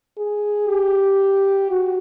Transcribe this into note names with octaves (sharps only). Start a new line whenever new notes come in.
G#4
G4
F#4